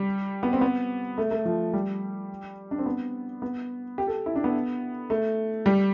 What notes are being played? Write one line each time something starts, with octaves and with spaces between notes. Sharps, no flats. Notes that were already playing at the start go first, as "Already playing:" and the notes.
Already playing: G3
B3
C4
B3
A3
A3
F3
G3
D4
C4
B3
B3
G4
A4
E4
D4
B3
A3
G3